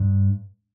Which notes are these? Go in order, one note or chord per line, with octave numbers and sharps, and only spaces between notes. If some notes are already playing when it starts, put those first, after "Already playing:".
Already playing: G2